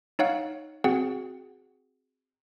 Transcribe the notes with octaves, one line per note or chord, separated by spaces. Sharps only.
D#4 C#5 F5 F#5
C4 F#4 G#4 F#5 G5